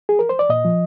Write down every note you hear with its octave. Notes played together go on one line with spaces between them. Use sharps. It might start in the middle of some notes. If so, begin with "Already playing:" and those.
G#4
A#4
C5
D5
A#2 D#5
F3